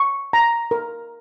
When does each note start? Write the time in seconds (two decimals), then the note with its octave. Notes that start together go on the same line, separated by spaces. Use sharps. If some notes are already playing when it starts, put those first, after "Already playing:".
Already playing: C#6
0.33 A#5
0.71 A#4